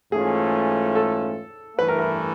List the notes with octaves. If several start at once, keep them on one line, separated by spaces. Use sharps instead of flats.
G#2 E3 A3 C#4 F4 G#4
A4
G2 E3 A3 B4
A#4
A#4